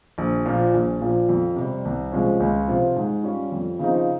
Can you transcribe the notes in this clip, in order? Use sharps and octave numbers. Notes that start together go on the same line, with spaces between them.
A#1
A#2 F3
A#1
A#2 F3
F2
C3
G3
C2
C3 F3 G#3 C#4
C#2
C3 F3 C4 F4
G#2
G3 C#4 F4
F2
C#3 F3 C4 D#4